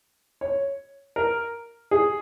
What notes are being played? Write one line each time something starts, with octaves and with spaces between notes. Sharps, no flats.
C#5
A#4
G#4